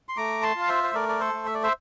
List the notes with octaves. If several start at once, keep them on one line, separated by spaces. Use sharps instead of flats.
C6
A3 A#5 D6
A5 C6
F4 F5
C5 E5
C5
A3 A#4 D5
D5
A4 C5
A3
E5
D5
C5 E5